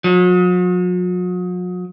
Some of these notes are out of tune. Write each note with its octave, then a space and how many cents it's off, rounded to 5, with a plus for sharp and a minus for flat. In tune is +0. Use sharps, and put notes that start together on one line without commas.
F#3 -45